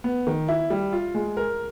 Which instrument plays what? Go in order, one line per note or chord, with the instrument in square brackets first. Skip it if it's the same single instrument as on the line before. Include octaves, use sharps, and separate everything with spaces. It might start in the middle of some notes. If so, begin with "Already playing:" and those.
[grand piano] B3
D#3
E4
G3
F4
G#3
A#4